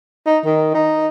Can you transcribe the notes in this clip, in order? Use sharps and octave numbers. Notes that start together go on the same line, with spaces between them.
D#4
D#3
D#4